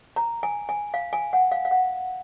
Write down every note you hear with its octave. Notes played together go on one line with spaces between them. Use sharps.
A#5
G#5
G#5
F5
G#5
F#5
F5
F5
F#5